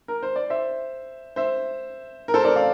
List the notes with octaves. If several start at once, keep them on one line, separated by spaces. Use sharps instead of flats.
A#4
C5
D5
C5 E5
C5 E5
A#4
A4 C5
A#4 D5
D5 F5